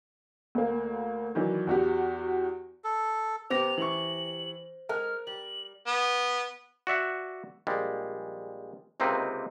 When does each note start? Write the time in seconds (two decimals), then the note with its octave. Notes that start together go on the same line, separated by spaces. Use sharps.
0.55 D2 A#3
1.35 D#3 E3 F#3 D4
1.67 E2 F#4 G4
2.84 A4
3.50 C3 B3 G4 C5 A#6 F7
3.78 E3 C#6 F#7
4.89 G#3 A#4 F6
5.27 G3 F#7
5.87 B3
6.87 F#4 D5 E5 F#5
7.67 A#1 G3 G#3
9.00 C#2 C3 A#3 C4 D#4 B4